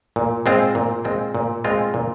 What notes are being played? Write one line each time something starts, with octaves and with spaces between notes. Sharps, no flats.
A#2
G#3 C4 F4
A#2
G#3 C4 F4
A#2
G#3 C4 F4
A#2